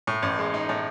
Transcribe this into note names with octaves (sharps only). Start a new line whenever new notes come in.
A2
A1
G#3
D#4
A2